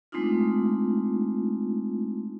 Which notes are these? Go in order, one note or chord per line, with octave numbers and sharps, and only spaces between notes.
G#3 A3 C4 D4 D#4 F4